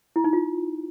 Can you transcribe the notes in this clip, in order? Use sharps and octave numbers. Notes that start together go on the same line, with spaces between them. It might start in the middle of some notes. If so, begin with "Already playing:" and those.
E4
D#4
F4